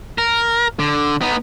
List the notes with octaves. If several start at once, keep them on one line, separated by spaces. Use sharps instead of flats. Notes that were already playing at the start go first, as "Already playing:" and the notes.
A#4
D3
B3 D#4